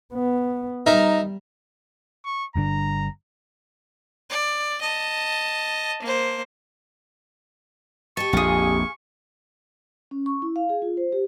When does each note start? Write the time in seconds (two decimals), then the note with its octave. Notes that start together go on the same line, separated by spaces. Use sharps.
0.14 B3
0.86 G3 D#4 A#4 E5
2.25 C#6
2.55 G1 G2 D3 A#5
4.30 D5
4.81 D#5 A5
6.02 A#3 C5
8.17 G4 D#5 A5 C#6
8.33 A#1 F2 F4 G#4
10.11 C#4
10.26 C#6
10.42 E4
10.56 F5
10.69 G#4
10.82 F4
10.97 C5
11.12 G4